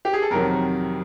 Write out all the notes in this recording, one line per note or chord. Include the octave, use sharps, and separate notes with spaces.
G4
G#4
A4
F2 C3 D#3 F#3 A#4